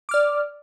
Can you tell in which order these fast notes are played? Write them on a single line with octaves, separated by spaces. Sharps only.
D6 F6 D5